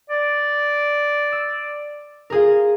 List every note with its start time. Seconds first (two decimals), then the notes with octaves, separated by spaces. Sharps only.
0.10 D5
1.32 E6
2.30 F4 G#4 A#4